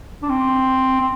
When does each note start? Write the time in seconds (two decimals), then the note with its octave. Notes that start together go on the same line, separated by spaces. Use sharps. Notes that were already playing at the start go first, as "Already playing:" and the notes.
0.23 D4
0.29 C4
1.00 C4